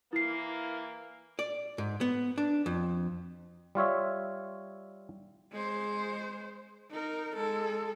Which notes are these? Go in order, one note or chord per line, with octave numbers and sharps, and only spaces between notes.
E3 A#3 E4 C7
D5
G#2
B3
D4
F2
G3 F4 C#5 E5
G#3 C5
D#4 A#4
G#3 A4